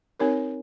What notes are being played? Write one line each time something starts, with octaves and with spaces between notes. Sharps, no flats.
C4 D#4 G4 A#4 C#5